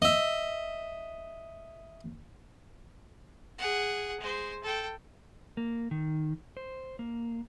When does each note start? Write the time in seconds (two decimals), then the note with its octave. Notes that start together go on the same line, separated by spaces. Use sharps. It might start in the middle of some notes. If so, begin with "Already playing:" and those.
0.02 D#5 E5
3.58 G#4 F#5
4.20 G#3 C5
4.63 A4 G5
5.57 A#3
5.91 D#3
6.57 C5
6.99 A#3